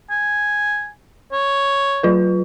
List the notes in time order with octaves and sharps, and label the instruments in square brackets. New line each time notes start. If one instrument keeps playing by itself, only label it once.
[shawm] G#5
C#5
[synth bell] F#3 F4 B4